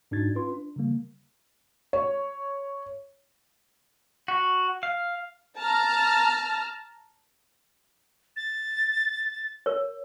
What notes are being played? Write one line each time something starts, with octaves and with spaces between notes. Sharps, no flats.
G#2 D4 D#4 F#4 G#6 A6
C#4 F4 B4 C6
D4
C#3 E3 G3 A#3
C#5
F#4
F5
A5 A#5 F6
A6
A#4 C#5